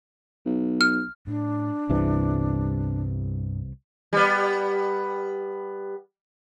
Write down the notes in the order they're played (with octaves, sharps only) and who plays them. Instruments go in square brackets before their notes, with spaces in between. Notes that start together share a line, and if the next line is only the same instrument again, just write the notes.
[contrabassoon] B1
[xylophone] F6
[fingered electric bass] A2 [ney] D4
[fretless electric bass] C2 C3 E3 [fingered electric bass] G2 G3 B3
[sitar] G3 B3